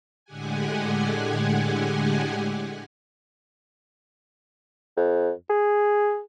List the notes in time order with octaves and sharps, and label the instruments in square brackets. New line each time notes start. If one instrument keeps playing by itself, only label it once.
[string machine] A2 D3 G#3 G4 F#5 G#5
[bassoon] F2
G#4